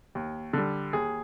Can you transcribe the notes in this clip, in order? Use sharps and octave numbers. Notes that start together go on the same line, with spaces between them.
D#2
D3 G3
D#2 G#4